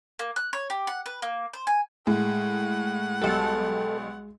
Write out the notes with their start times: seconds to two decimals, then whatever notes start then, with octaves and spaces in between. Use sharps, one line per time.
0.19 A#3
0.36 F#6
0.53 C#5
0.70 G4
0.87 F#5
1.06 B4
1.22 A#3
1.53 C5
1.67 G#5
2.07 A2 G#3 F#5
3.22 B1 G3 A4